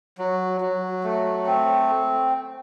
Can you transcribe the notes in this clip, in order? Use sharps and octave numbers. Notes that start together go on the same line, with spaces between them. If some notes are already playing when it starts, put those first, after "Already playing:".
F#3
F#3
A3
C4